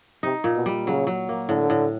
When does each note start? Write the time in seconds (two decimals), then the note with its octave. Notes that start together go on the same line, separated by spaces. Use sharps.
0.23 C3 D#4
0.44 A#2
0.56 B2
0.66 G3
0.87 C#3 F#3
1.07 F#3
1.29 A#3
1.49 A2 D3
1.70 A2